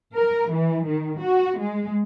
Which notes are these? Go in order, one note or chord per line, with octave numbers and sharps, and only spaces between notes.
A#4
E3
D#3
F#4
G#3